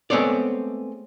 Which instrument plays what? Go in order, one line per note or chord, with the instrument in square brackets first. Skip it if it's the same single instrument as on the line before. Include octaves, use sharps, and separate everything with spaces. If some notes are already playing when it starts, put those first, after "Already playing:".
[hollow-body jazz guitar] G#3 A3 B3 C4 C#5 D5